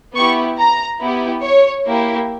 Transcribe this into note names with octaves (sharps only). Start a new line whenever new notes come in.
B3 E4 G4 C#6
A#5
B3 E4 G4
C#5
A#3 E4 G4